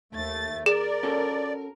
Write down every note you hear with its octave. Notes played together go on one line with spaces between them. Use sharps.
D#2 A3 A6
G#4 A#4 D5
C#4 F#4 A4